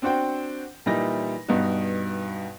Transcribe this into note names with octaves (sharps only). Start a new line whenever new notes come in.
C4 D4 F#4 C5 F#5 G5
A#2 E3 G3 D#4 E4 A#6
G2 B2 B3 D#4 F#4